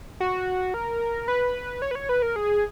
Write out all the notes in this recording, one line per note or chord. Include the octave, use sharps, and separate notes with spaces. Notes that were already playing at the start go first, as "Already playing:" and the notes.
F#4
A#4
B4
C#5
B4
C#5
B4
A#4
G#4